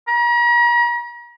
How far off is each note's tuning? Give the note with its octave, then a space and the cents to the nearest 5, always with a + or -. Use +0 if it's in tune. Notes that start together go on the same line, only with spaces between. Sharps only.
A#5 +40